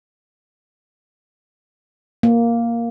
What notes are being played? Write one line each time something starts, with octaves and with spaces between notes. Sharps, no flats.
A#3